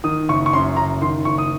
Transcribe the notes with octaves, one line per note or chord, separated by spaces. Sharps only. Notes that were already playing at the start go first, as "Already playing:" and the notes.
D#3 D#6
F#1 C#6
C#6
F#2 C6
F#1 A#5
D#3 C6
F#1 C#6
D#6